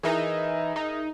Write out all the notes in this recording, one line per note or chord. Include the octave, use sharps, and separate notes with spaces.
E3 D#4 G#4 A#4 E5
D#4